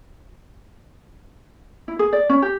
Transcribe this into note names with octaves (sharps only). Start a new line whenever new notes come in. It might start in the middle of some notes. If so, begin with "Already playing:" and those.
E4
G#4
D5
C#4
G4